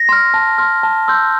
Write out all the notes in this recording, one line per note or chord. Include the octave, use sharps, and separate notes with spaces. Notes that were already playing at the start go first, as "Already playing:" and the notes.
Already playing: A#6
C6 F6
A5
C6 F6
A5
C6 E6 G6